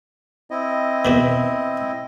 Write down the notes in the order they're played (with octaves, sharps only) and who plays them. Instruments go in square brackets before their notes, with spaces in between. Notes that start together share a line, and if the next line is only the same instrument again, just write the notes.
[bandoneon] C4 E4 D#5
[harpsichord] E2 B2 D#3